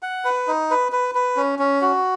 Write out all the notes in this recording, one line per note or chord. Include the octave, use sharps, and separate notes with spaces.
F#5
B4
D#4
B4
B4
B4
C#4
C#4
F#4